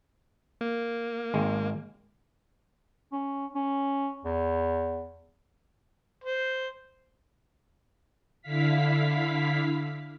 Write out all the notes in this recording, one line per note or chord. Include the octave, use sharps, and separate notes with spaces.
A#3
G#1 G#3
C#4
C#4
E2
C5
D3 E4 F5 B6